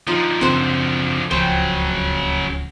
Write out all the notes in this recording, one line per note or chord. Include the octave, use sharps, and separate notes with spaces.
D3 F3 D#4 F4
F#2 C#3 C4 C5 E5 F#5
D1 C#2 C#3 F3 F#3 C5 G5 C#6